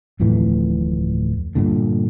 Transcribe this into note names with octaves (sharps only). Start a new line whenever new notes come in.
D1 F2 A2 E3
G2 A#2 D3